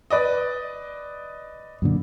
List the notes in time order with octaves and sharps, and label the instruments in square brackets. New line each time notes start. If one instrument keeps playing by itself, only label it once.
[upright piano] B4 D5 D#5
[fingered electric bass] F#2 A#2 D3